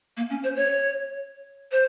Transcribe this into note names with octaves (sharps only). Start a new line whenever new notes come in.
A#3
C#4
C5
C#5
C5